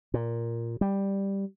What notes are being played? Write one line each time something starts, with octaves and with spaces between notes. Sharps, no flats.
A#2
G3